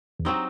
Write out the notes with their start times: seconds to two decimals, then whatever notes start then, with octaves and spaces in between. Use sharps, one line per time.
0.20 E2
0.25 F#3 C4 D#4